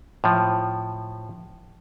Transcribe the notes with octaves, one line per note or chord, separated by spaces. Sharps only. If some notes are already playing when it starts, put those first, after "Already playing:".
A2 F3